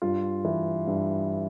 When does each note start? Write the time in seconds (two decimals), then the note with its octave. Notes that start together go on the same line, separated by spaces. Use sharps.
0.02 G2 F4
0.45 E3
0.87 G2